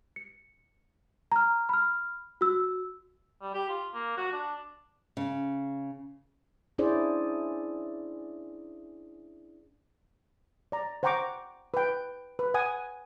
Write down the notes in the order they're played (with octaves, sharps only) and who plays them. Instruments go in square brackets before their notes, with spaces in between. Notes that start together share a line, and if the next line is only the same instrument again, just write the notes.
[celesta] C#7
A#5 F6
B5 F6
F#4 E6
[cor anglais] G3
G4
F4
A#3
F#4
D4
[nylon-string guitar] C#3
[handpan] C#4 D4 E4 G#4 C5 D5
[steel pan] D5 A#5
C5 F#5 G5 A#5 C#6 D6
B4 G5
B4
F#5 G#5 D#6